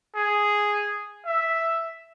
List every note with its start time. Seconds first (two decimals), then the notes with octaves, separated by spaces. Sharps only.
0.15 G#4
1.26 E5